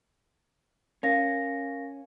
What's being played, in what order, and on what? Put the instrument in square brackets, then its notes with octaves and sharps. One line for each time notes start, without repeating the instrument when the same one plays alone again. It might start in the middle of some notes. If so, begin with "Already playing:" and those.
[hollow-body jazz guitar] C#4 [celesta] A#4 F5 A#6